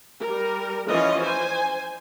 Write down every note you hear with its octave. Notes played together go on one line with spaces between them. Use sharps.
G3 A#4
E3 F3 C#4 F4 D#5
C5 G#5